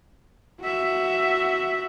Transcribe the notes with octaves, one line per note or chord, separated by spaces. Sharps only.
F#4 E5